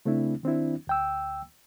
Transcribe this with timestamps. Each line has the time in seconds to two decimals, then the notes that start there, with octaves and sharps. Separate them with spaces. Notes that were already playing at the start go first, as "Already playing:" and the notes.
0.05 C#3 A3 C4 D4 E4
0.43 D#3 C4 D4 E4
0.87 D2 G5 E6